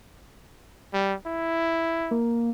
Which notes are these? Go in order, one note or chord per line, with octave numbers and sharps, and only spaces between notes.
G3
E4
A#3